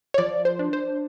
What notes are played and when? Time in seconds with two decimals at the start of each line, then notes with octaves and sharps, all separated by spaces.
0.14 C#5
0.18 F3 D5
0.45 C5
0.59 D4
0.73 C5